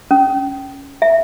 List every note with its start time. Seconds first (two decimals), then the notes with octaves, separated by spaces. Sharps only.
0.11 C#4
1.02 E5